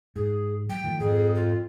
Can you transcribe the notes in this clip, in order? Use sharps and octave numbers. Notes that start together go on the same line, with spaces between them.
G#2 G#4
F#3 G5
D#3 F3 A3
F2 G#2 G#4
F4